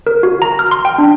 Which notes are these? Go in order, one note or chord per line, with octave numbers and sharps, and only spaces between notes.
A#4
F#4
A#5
F6
C6
G5
D4